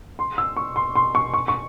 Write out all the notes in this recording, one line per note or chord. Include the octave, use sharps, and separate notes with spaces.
C6
E6
C#6
C6
C6
C#6
C#6
C#6